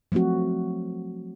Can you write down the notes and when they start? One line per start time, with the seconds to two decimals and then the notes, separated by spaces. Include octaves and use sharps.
0.12 F3 F#3 A3 C4 F#4